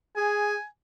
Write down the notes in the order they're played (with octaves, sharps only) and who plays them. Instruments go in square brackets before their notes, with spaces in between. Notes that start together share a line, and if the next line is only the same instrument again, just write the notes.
[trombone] G#4 [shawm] G#5